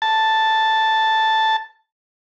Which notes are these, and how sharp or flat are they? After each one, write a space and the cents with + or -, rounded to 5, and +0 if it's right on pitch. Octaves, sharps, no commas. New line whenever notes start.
A5 +0